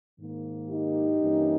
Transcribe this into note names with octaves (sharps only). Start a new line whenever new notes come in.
G#2 D#3 A#3
D#4 G4
G2 E3 A#3 C#4